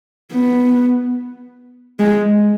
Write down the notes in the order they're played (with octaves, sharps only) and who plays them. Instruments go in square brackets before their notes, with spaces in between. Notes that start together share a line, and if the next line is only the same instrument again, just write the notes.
[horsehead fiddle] B3
G#3